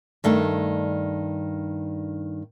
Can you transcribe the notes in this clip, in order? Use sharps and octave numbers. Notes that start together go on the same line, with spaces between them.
G2 D#3 A3 D4